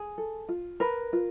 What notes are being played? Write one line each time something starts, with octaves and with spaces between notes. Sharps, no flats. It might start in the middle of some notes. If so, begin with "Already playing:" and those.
Already playing: G#4
A4
F4
A#4 B4
F4